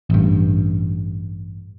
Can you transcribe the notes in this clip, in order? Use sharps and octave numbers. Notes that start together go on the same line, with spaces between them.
A1 G2